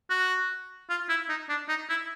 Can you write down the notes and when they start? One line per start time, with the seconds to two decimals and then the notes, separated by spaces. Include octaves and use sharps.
0.10 F#4
0.90 F4
1.09 E4
1.29 D#4
1.49 D4
1.69 D#4
1.89 E4